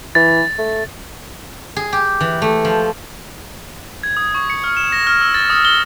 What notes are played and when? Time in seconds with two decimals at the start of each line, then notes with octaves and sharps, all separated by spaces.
0.15 E3 A6
0.58 A3
1.76 G#4
1.93 G4
2.21 E3
2.42 A3
2.65 F3
4.03 G#6
4.17 D#6
4.35 C#6
4.50 C#7
4.64 F6
4.77 E7
4.92 A#6
5.07 F6
5.21 E6
5.34 A6
5.50 D#6
5.65 G7